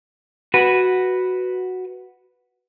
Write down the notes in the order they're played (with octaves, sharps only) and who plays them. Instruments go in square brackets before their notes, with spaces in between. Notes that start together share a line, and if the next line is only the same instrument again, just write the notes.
[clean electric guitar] F#4 B4